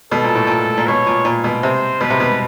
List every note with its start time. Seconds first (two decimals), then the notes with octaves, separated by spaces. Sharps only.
0.12 B2 A4
0.24 A#2
0.35 A2
0.47 A#2
0.78 A#2
0.87 B2 C#5
1.07 A#2
1.25 A#2
1.44 B2
1.63 C3 C5
2.01 B2 B4
2.10 C3
2.20 B2